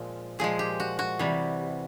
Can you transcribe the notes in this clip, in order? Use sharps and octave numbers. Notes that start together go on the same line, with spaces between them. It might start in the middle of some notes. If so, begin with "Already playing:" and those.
Already playing: A#2 F3 G#3
A#2 F3 G#3 G#4
G4
F#4
F#4
C3 E3 G3